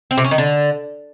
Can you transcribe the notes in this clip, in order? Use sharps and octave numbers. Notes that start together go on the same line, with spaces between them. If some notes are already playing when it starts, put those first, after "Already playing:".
C4
C3
C#4
D#3
D3